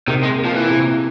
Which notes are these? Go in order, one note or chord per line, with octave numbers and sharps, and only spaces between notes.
C3 D#3
G#3
A#3
F3
E3
C3